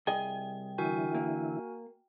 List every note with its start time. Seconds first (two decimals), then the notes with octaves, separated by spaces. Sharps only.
0.07 C2 G#4 D#5 G5
0.78 D3 E3 E4 F#4 A#4 G#5
1.14 A#3